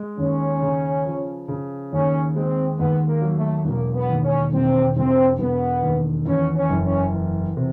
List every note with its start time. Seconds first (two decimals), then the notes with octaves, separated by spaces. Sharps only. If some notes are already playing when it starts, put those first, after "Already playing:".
Already playing: G#3
0.18 D#2 C#4
0.62 C#3
1.05 F3
1.48 C#3
1.92 D#2 C#4
2.36 G#3 C4
2.78 D#2 B3
3.07 A#3
3.22 F#3
3.36 A3
3.65 E1 A#3
3.94 B3
4.10 D#2
4.24 C#4
4.53 E1 C4
4.96 E1 C4
5.39 E1 B3
5.83 D#2
6.26 E2 C#4
6.55 C#4
6.69 F#1
6.84 C#4
7.13 E2
7.57 C3